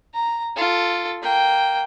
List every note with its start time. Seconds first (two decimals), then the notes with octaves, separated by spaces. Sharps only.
0.14 A#5
0.56 F4 A4
1.23 A#3 G5